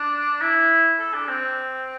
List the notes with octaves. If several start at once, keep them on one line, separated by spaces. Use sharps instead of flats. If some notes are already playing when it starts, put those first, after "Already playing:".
Already playing: D4
E4
A4
D4
C4